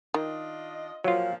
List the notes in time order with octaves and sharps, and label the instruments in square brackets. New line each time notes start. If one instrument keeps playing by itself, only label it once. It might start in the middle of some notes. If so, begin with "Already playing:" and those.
[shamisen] D#3 [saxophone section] D4 F4 D#5
[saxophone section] A#2 F3 [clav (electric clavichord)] F#3 F4 [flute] F5